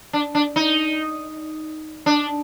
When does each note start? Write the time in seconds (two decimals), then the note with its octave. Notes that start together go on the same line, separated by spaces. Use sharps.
0.13 D4
0.35 D4
0.56 D#4
2.06 D4